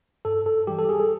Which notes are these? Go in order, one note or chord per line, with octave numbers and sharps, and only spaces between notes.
G2 A4
A4
E3 G3 G4
A4
G#4
A4